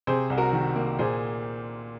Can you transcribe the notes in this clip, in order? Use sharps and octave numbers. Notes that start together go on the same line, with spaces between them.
C3 G#4 C5
C2
F#4 A#4
D#3
A#3
A#2 G#4 C5